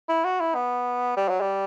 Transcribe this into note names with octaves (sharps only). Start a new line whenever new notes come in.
E4
F#4
E4
B3
G3
F#3
G3